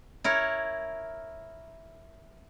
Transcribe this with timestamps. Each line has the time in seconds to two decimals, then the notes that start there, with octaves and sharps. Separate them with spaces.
0.24 E4 A#4 C#5